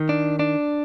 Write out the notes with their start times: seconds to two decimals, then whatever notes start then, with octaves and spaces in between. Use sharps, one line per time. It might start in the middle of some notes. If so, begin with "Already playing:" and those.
Already playing: D#3
0.09 D4
0.39 D4